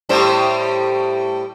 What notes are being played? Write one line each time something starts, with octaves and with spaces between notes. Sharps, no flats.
A2 G3 C5